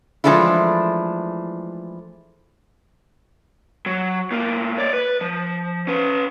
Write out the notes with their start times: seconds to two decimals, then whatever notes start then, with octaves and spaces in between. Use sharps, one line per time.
0.24 E3 F3 G#3 A3 D4 E4
3.86 F#3
4.31 A2 A#3
4.78 C#5 D5
4.93 B4
5.21 F3
5.87 C#4 B4